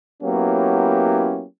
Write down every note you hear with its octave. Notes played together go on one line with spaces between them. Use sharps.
F#3 A#3 B3 C#4 E4 G4